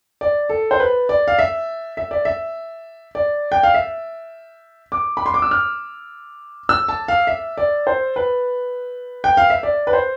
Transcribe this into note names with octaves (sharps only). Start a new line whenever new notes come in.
D5
A4
C5
B4
D5
F5
E5
E5
D5
E5
D5
G5
F5
E5
D6
B5
C6
D6
E6
F6
E6
A5
F5
E5
D5
C5
B4
G5
F5
E5
D5
B4
C5